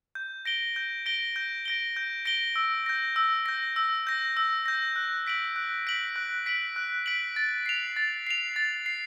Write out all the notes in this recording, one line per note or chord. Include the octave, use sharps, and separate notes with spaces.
G6
A#6 D7 G7
G6
A#6 D7 G7
G6
A#6 D7 G7
G6
A#6 D7 G7
E6
G6 A#6
E6
G6 A#6
E6
G6 A#6
E6
G6 A#6
F#6
B6 D7 F#7
F#6
B6 D7 F#7
F#6
B6 D7 F#7
F#6
B6 D7 F#7
A6
C7 F7
A6
C7 F7
A6
C7